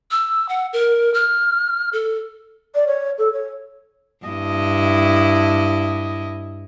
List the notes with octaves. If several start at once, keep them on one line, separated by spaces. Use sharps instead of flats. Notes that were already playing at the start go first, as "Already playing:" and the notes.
E6
F#5
A#4
F6
A4
D5
C#5
A4
C#5
G2 E4 D#5